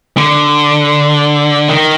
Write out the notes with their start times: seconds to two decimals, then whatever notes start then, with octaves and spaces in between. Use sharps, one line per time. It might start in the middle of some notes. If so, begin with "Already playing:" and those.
0.17 D3
1.68 D#3